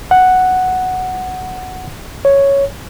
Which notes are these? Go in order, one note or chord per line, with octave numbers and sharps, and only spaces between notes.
F#5
C#5